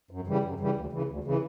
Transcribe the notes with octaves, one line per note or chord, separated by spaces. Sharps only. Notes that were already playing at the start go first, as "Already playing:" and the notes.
F#2
C#3 E3 G3
F#2
C#3 E3 G3
D2
C#3 E3
D2
C#3 E3